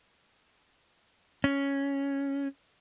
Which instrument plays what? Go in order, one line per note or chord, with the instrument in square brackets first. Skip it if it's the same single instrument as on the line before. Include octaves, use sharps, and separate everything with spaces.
[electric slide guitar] C#4